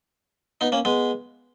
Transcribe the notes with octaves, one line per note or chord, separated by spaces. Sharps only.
B3 D#4
A#3 C#4
G#3 B3